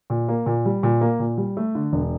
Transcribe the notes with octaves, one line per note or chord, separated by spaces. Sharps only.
A#2
A#3
A#2
G3
A#2
A#3
A#2
G3
A3
D3
E1